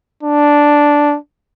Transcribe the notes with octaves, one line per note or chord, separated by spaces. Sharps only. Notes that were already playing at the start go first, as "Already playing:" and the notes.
D4